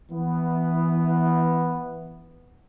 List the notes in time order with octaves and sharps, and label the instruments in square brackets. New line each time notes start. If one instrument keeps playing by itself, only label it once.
[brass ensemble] E3 B3